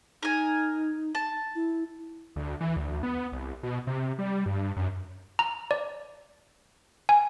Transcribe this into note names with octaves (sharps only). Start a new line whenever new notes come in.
D#4 A#4 G#5
A5
E4
D2
E3
D2
B3
C2
B2
C3
G3
G2
F#2
A#5
D5
G#5